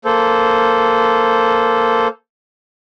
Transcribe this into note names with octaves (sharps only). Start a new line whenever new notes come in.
A#3 A4 C5